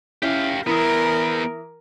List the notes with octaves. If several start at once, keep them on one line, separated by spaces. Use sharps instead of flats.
C#4 E4 G4 F5
E3 B3 E4 A#4 D#6